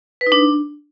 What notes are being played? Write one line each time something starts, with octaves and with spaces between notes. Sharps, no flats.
B4
D#4
D4